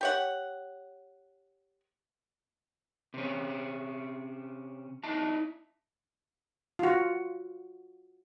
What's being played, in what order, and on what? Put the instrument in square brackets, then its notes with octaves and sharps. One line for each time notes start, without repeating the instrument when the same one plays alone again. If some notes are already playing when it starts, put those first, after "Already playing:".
[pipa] G4 C#5 F#5
[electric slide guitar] C3 C#4
D#4 E4 A5
[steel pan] F4 F#4